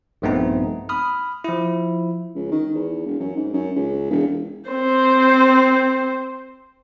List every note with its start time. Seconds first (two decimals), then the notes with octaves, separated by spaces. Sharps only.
0.22 A#1 G2 A3 B3 C4 D#4
0.89 B5 D#6 F6
1.44 F3 E4
2.35 C#2
2.51 D#3
2.74 E2
3.06 E1
3.19 F#2
3.35 G#2
3.53 F#2
3.76 C#2
4.10 E1
4.69 C4 C5